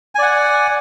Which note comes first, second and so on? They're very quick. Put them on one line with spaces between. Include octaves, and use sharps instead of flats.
G#5 D5 F#5